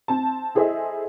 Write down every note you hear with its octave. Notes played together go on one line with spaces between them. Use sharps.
C4 A5
E4 G#4 A4 C5 D#5 E5